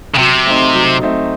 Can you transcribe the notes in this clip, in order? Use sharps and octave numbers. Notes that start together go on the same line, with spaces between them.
C#3
C3 F#3
A3 C4 D#4
F#3
A3 C4 D#4